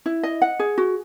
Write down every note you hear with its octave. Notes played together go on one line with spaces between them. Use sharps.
E4
D#5
F#5
G#4
F#4